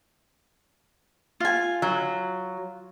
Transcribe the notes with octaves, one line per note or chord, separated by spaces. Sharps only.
F4 G#5
F#3